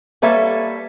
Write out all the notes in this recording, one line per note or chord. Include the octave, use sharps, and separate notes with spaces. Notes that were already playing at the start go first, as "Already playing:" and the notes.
G3 A#3 A4 B4 C#5 E5